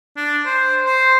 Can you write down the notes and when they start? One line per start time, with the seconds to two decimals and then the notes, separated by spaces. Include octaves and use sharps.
0.17 D4
0.46 C5
0.86 C5